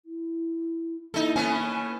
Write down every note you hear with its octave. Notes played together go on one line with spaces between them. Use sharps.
E4
A#3 D#4 E4 A4
A3 B3 C#4 G#5